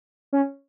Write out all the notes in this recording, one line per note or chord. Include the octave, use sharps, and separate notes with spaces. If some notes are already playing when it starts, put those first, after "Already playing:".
C#4